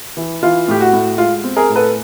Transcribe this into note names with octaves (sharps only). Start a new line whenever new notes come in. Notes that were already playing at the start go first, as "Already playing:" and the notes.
E3
E3 F4
A2 G4
F#4
A2
G#3 F4
C4
G#4 A#4
A2
A4 B4